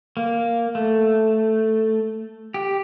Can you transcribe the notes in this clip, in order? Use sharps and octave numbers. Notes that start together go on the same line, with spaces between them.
A#3
A3
G4